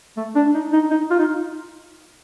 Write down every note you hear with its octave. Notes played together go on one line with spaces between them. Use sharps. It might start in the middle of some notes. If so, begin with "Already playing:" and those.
A3
D4
D#4
D#4
D#4
F4
D#4